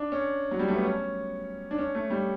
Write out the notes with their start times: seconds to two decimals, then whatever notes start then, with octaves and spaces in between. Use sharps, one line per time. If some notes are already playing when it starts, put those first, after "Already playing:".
Already playing: D4
0.12 C#4
0.51 F#3
0.59 G3
0.68 A3
0.75 B3
0.84 C#4
1.71 D4
1.78 C#4
1.95 A3
2.10 G3